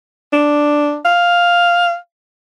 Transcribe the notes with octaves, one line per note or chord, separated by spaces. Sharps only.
D4
F5